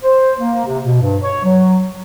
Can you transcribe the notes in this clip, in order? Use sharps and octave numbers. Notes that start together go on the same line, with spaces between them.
C5
A#3
C3
B2
G2
C#5
F#3